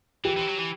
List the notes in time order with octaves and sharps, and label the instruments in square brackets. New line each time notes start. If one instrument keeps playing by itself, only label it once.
[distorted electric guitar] E3 [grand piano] G4
[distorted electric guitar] E3
F#3
E3